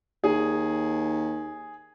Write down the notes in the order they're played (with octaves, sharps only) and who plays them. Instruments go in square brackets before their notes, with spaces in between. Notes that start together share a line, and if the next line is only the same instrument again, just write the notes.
[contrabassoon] D#2 [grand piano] G#4